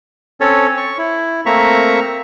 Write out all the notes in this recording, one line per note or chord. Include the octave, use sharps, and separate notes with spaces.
C4 C#4 A4 C#5
C#6
E4
A3 A#3 C4 E5 A#5 C#6